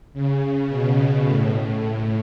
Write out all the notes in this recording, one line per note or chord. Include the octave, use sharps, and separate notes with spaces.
C#3
B2
A2